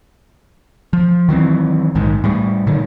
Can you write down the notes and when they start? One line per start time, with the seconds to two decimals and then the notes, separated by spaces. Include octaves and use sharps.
0.93 F3
1.29 D#3 E3 F#3 C4
1.95 A#1 G#2 D#3
2.24 A2 G3
2.67 A#2 D3 D#3 F#3